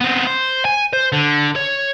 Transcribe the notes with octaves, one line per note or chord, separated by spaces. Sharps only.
B3 C4
C5
G#5
C5
D3
C#5